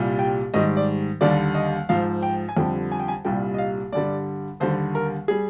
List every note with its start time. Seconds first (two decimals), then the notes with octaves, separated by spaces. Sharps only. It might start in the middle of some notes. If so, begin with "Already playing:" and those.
Already playing: C2 A#2 G3
0.19 G5
0.54 G#2 D#3 G3 D#5
0.77 D5
1.21 D#2 D3 G3 D5
1.55 D#5
1.89 G#2 F3 F5
2.23 G5
2.49 G#5
2.57 F2 D3 G3 G5
2.92 G#5
3.00 G5
3.08 G#5
3.25 C2 A#2 G3 G5
3.54 D#5
3.58 F5
3.92 G2 D3 G3 D5
4.60 D#2 D3 G3 C5
4.95 A#4
5.28 G3 G#4